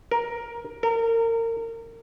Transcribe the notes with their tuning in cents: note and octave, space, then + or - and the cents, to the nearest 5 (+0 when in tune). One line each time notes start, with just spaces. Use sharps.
A#4 +10
A#4 -30